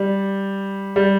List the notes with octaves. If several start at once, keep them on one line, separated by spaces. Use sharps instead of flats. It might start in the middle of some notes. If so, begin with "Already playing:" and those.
Already playing: G3
G3